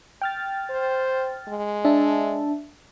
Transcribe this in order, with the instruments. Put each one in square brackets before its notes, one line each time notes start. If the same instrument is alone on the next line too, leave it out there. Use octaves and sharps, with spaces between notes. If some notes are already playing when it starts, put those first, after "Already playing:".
[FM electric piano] G5 F6 A6
[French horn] C5
G#3
[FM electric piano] D4 E5 A5